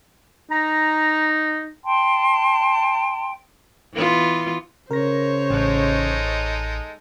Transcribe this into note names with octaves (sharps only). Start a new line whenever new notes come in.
D#4 A#5
G5 A5 C6
E3 B3 F4
C#3 A#4 C5 C#5 A#6
A1 G#3 D#4 A4